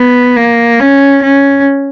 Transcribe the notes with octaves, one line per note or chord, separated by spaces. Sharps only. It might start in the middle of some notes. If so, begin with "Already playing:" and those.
Already playing: B3
A#3
C#4
C#4